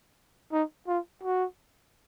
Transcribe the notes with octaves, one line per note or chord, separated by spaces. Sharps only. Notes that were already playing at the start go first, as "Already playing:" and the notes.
D#4
F4
F#4